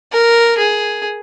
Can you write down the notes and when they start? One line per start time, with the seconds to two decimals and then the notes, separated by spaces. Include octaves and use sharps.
0.12 A#4
0.57 G#4